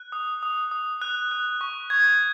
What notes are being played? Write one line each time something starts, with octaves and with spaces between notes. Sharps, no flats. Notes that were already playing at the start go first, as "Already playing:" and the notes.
Already playing: F#6
D#6
D#6
D#6
F#6
F#6
C#6
C#6 G#6